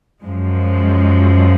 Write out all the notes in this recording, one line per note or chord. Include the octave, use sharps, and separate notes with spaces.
F#2 F3 G#3